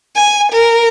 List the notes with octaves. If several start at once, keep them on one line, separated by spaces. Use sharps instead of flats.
G#5
A#4